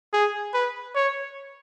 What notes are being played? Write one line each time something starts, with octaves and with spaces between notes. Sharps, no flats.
G#4
B4
C#5